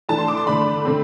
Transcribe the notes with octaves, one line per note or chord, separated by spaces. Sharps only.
E3 A3 D4 A5
C6
D6
C6
D3 A3 D4 B5
D3 A3 C4